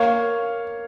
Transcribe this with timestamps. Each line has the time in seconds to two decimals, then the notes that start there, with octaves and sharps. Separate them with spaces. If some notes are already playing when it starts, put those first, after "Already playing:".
Already playing: A#3 C#5 F5